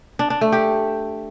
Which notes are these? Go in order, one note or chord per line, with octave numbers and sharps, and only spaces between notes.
D4
D4
A3
G4